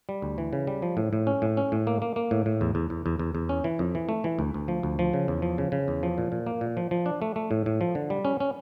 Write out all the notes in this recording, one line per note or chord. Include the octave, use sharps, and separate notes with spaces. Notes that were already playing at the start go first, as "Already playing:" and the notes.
G3
D2
E3
C#3
G3
F3
A2
A2
C#4
A2
C#4
A2
A#3
A#3
A#3
A2
A2
E2
E2
E2
E2
E2
E2
C#4
E3
F2
E3
A3
E3
D2
D2
F3
D2
F3
C#3
E2
F3
C#3
C#3
E2
F3
A#2
A#2
A#3
A#2
F3
F3
D4
A3
A3
A2
A2
F3
D3
G3
C#4
C#4